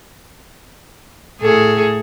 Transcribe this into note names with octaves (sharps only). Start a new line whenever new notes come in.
A2 G#4 A4